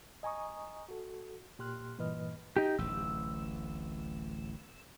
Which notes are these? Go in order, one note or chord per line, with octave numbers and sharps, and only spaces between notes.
D#5 G#5 A#5 C#6 D#6
F#4 A4
A#2 G4 C6 F6 F#6
G2 A#2 E3 B4 D#5 F6
D#4 G4
D1 A1 E6